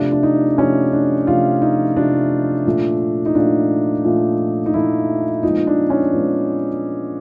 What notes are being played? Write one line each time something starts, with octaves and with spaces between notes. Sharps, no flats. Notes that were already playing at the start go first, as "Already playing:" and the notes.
Already playing: C3 F3 A3 D4
D4
D#4
C3 F3 A3 C#4
D4
C3 F3 A3 F4
D#4
C3 F3 A3 D4
A#2 F3 A3
D#4
A#2 F3 A3 D4
A#2 F3 A3
D#4
A#2 F3 A3 E4
A#2 F3 G#3 B3 D#4
D4
C#4
A#2 F3 G#3 B3